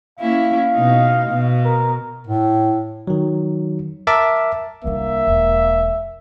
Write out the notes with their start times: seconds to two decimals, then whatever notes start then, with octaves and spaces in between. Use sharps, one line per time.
0.19 A#3 C#4 E4 F5
0.74 B2 D#4
1.30 B2
1.64 A#4
2.27 A2
3.07 D#3 F#3
4.07 A#4 E5 A5 D6
4.84 C2 A#3 D4 E5
5.27 E1